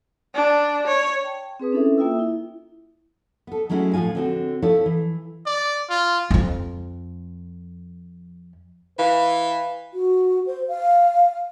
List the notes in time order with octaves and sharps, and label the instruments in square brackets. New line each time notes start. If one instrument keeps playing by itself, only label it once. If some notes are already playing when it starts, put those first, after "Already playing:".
[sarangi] D4
C#5
[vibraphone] G5 A5
C4 G#4 B4 D#6
C#4 D4 E4 A4 A#4 E5
A#3 F4 E5 G5 D#6 E6
E4
[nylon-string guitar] B3 A4
F#3 G#3 A3 C#4 E4 F#4
A2 F3 F#3 F4 G#5
D3 C4 F#4
F3 E4 A4 C#5
E3
[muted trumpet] D5
F4
[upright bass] F2 F3
[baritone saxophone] E3 [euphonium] B4 [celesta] F5
[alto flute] F#4
C5
F5